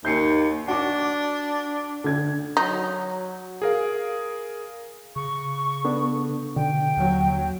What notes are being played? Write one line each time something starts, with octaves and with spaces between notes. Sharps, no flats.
D#2 G6 C7 C#7
D4 F#4 D6
D3 G#6
F#3 D#4
G#4 A#4 F5
C#3 C#6
B3 D4 A4
B2 D3 G5
D#2 F#3